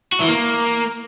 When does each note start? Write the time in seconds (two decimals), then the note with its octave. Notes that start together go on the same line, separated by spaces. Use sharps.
0.12 F#4
0.20 E3
0.28 A#3